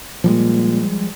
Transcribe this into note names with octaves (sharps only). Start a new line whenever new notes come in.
A#2 F3 G3 G#3